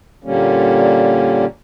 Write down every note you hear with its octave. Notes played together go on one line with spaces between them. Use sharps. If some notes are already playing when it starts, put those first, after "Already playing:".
A#2 D3 G3 A#3 C#4